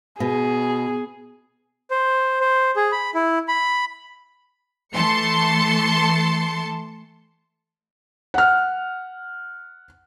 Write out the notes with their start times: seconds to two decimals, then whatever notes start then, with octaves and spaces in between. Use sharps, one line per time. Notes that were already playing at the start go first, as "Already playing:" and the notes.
0.20 B2 G#4
1.90 C5
2.41 C5
2.76 G#4
2.92 B5
3.14 E4
3.48 B5
4.93 E3 A3 A5 C6 C#7
8.34 F#5 F6